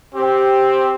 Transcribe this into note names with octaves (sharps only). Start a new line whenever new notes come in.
C4 G4